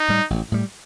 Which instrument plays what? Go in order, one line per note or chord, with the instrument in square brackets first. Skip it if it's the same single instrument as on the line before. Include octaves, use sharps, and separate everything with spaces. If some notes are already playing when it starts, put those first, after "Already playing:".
Already playing: [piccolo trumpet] D#4
[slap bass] A2 G3
A1
A2 G3